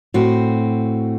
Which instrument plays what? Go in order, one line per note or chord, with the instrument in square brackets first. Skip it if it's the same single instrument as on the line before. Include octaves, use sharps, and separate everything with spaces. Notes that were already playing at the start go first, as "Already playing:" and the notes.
[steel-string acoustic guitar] A2 C4 F#4